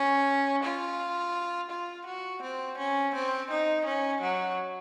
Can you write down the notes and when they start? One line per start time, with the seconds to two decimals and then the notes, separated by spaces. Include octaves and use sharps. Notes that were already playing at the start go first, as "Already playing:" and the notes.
Already playing: C#4
0.64 F4
1.70 F4
2.06 F#4
2.42 C4
2.78 C#4
3.14 C4
3.50 D#4
3.85 C#4
4.21 F#3